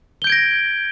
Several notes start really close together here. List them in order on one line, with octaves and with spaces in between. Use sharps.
G7 G6 D7 G#6 A#6